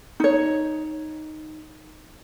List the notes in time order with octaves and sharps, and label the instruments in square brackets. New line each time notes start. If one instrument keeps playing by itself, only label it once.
[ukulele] D#4 C#5